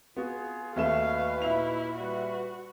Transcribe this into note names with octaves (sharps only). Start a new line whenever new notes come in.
B3 F4 F#4 G#4
D#2 A3 D#4 F#4 B4 F5 E7
A#2 E4 E5 F7
G3 F#4 B4